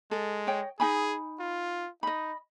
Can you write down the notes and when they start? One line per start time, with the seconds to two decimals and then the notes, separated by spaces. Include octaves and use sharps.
0.11 G#3 A4
0.47 C#5 D#5 G5
0.80 D#4 G#4 G#5 B5
1.40 F4
2.03 D#4 D#5 B5